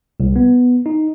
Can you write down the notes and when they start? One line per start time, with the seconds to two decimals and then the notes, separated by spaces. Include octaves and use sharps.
0.20 C2
0.36 B3
0.86 D#4